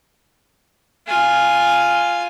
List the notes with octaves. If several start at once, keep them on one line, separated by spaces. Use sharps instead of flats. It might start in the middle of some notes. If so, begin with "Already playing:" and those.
F4 G#5